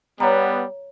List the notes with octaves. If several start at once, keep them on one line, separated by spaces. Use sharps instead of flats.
G3 B3 C#5 A#5